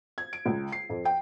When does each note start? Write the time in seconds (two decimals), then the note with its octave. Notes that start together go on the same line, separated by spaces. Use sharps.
0.18 G#6
0.33 D7
0.46 C#2
0.72 C7
0.89 F2
1.05 G5